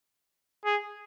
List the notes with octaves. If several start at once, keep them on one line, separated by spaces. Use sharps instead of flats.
G#4